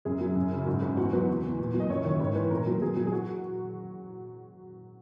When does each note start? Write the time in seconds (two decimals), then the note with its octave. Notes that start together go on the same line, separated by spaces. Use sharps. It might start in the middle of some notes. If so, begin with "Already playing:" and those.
0.05 F#2 G#4
0.21 F#3
0.36 F#2
0.52 C#3
0.66 G#2 F#4
0.82 G#2
0.97 E2 F#4
1.13 F#3 B4
1.28 E2
1.43 E2
1.58 A#2
1.74 F#3
1.80 D#5
1.90 F#2 C#5
2.04 D#3 C#5
2.19 G#2 C#5
2.35 E3 B4
2.51 A#2 A#4
2.67 F#3
2.81 F#3 G#4
2.96 F#3
3.06 G#4
3.12 F#4